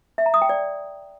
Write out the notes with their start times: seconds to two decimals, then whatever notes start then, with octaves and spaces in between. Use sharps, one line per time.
0.18 E5
0.26 A#5
0.34 D#6
0.42 G5
0.49 D5